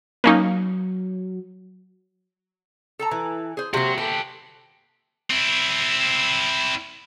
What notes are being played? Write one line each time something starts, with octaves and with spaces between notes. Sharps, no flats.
F#3 A#3 C#4 D#4
A4 A5 A#5
E3
G#4 C5
C3 F#3 A#3 F#4 E5
G4 A4 B4
C4 E4